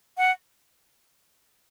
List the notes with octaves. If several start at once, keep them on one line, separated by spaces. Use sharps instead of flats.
F#5